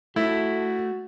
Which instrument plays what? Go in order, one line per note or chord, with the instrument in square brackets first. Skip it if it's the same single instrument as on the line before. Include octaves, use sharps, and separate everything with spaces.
[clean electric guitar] A3 [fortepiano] E4 [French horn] F#4